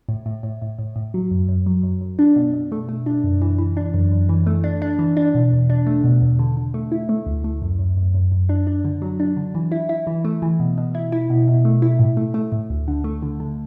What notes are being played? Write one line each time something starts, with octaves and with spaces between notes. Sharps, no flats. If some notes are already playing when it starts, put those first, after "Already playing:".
A2
A2
A2
A2
A2
A2
F#3
F#2
F#2
F#3
F#2
F#2
D4
B2
B2
A3
A3
D4
F#2
E3
E3
D4
F#2
F#2
E3
A3
D4
D4
E3
D4
B2
E2
D4
A3
B2
E2
D3
D3
A3
E4
A3
D2
A3
F#2
F#2
F#2
F#2
F#2
D4
D4
D3
F#3
D4
D3
E3
E4
E4
E3
A3
E3
B2
B2
E4
E4
B2
B2
A3
E4
A2
A3
A3
A2
D2
D3
A3
D3
D3